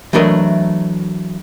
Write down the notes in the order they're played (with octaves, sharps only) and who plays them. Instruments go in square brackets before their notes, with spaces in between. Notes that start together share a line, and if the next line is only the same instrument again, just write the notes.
[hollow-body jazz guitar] E3 F#3 A3 D4 A#4 D#5